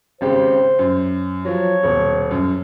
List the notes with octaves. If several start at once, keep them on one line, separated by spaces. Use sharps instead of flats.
G#1 C#3 G4 C5
F#2
F3 F#3 C#5
D#1 B2
F#2